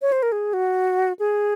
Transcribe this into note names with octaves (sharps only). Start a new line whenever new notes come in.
C#5
C5
A#4
G#4
F#4
G#4